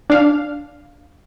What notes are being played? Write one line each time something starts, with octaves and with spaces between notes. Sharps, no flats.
D4 F5